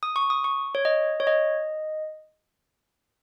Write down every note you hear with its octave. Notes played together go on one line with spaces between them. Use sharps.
D#6
C#6
D#6
C#6
C#5
D#5
C#5
D#5